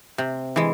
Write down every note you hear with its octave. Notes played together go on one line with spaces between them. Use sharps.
C3
E3 G#3